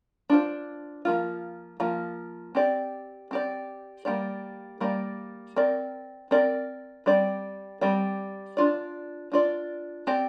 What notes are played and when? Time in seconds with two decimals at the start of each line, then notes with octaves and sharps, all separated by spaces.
0.30 D4 F4 C5
1.05 F3 A#3 F4
1.80 F3 A#3 F4
2.55 C4 G4 D5
3.31 C4 G4 D5
4.05 G3 A#3 G4 D5
4.80 G3 A#3 G4 D5
5.56 C4 A#4 D5
6.31 C4 A#4 D5
7.06 G3 C4 G4 D5
7.81 G3 C4 G4 D5
8.57 D4 F4 D5
9.32 D4 F4 D5
10.07 C4 G4 D5